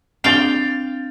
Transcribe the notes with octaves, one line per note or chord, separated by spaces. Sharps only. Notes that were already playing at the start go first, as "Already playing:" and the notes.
C4 D4 F5 G5 A6 F7